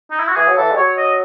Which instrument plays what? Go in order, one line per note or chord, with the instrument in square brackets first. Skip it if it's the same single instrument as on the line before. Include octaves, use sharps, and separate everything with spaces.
[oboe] D#4
E4
F#4
[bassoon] E3 [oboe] G#4
[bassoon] F#3
[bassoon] E3 [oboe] A4
[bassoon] G#3
[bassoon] F#3 [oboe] C#5
[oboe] D#5